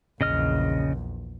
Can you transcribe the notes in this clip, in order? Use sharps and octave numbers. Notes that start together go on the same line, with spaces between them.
A#1 E2 C#3 D#5 F6